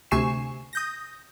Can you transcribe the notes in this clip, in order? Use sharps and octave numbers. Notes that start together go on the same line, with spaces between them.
D2 C3 G#5 C#6 C7 E7
D#6 G6 A#6